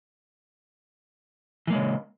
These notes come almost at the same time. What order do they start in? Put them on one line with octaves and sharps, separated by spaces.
E3 A#3 G#3 C#3